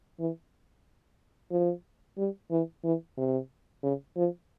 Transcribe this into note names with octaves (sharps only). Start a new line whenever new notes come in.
E3
F3
G3
E3
E3
C3
C#3
F3